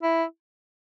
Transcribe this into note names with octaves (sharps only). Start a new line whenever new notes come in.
E4